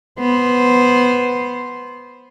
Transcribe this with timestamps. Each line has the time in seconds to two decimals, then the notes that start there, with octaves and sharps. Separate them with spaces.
0.19 B3 C5